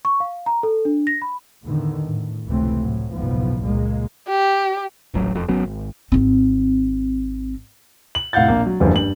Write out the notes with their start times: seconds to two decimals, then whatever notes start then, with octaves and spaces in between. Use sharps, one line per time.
0.05 C#6
0.20 F5
0.46 A#5
0.63 A4
0.85 D4
1.07 A#6
1.22 B5
1.63 E2 A2 D3 D#3
2.06 A2
2.46 F1 C#2 C3 E3 A3 C4
2.79 A2 F#3
3.13 F#1 B1 E2 G#2 F3 B3
3.63 C#2 A#2 G#3 A#3
4.28 G4
5.14 D#1 A1 F#3
5.35 E1 F2
5.48 G#1 F#3 B3 C#4
5.65 G#1
6.12 G#1 C4
8.15 F#7
8.33 F1 A2 F5 F#5 G6 A6
8.48 A#1 A#3
8.66 F#3
8.80 F#1 E2 G2 F3
8.94 G2 F#7